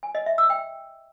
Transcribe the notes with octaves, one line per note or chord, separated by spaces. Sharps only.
G#5
D#5
E5
E6
G5